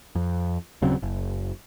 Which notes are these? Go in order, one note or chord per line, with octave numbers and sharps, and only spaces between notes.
F2
D#1 C#3 F#3 C4
F#1